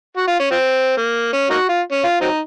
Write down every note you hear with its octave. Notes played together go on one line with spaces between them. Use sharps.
F#4
F4
C#4
F3 C4
A#3
C#4
A#3 D#4 F#4
F4
C#4
F4
F#3 C4 D#4